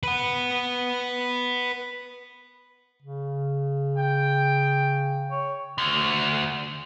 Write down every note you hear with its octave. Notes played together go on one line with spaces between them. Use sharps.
B4 F#5
C#3
G5
C#5
D2